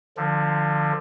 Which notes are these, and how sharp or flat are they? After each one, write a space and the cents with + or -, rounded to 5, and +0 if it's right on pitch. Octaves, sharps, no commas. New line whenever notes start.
D3 +25 F3 +0